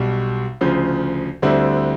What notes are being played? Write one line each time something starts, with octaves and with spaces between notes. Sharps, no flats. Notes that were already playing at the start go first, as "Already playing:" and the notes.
Already playing: B1 B2 G3
D2 C#3 F3
D2 D3 G3 C4 E4